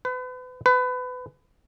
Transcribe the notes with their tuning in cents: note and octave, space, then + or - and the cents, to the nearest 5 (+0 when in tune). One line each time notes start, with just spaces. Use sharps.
B4 +35
B4 +25